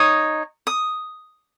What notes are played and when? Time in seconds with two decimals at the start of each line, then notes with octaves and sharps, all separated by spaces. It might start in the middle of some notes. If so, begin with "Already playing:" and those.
Already playing: D#4 C#5 D#6
0.67 D#6